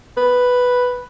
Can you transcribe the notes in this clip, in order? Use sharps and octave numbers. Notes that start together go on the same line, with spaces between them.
B4